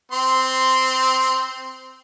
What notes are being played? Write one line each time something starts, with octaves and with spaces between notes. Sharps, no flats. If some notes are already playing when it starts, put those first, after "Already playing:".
C4 C6